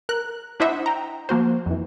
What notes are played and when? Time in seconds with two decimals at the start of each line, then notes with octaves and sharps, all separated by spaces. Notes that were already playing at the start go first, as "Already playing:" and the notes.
0.09 A#4 F#6
0.60 D4 E4 C5 D#5 E5 F#5
0.86 G5 A#5
1.29 F3 A#3 F#4 C5
1.66 F2 E3